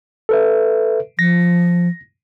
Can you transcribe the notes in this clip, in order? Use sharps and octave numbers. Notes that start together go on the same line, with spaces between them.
A4 B4 E5
F3 A#6